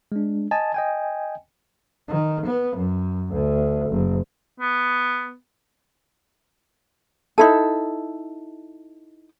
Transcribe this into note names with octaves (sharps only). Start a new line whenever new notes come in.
G#3 D4
D#5 G#5 A5
D#5 G5 G#5
D#3
B3
F#2
D2
F#1
B3
D#4 E4 A4